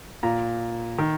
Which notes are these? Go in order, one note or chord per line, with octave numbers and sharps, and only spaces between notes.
A#2 A#5
D#3